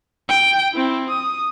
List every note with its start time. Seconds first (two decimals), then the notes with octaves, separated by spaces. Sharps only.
0.29 G5
0.73 C4 E4
1.10 D#6